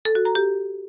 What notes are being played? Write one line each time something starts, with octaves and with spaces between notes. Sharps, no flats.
A4
F#4
A#5
G4